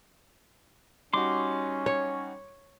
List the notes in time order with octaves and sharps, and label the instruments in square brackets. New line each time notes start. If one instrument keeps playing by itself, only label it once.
[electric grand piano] G3 D#4 F#4 [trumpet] C#4 [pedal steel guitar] C6 D6
[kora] C#5